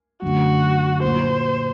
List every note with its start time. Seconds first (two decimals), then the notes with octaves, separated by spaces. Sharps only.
0.22 F#2 D3 A3 F#4
1.02 A#2 F#3 A#3 C5